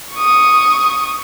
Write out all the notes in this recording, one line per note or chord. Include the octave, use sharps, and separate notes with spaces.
C#6 D#6